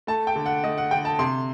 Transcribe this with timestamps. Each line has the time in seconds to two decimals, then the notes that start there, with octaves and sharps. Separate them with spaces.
0.07 A3 A5
0.27 G5
0.36 D3
0.46 F#5
0.64 A3 D#5
0.78 F#5
0.91 D3 G5
1.05 A5
1.19 C3 C6